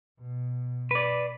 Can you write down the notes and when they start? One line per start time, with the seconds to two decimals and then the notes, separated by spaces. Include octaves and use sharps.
0.20 B2
0.91 B4 D5